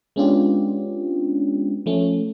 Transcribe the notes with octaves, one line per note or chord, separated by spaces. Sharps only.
G#3 B3 C#4 D4 F4 G4
F3 A3 C#4